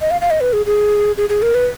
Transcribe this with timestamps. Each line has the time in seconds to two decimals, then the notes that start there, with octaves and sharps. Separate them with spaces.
0.01 D#5
0.11 F5
0.21 F5
0.31 D#5
0.41 B4
0.53 G#4
0.66 G#4
1.17 G#4
1.29 G#4
1.42 A#4
1.54 B4